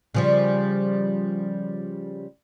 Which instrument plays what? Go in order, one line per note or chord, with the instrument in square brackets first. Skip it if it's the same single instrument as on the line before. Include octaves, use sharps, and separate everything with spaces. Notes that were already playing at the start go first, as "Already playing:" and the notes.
[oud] C#3 F3 G3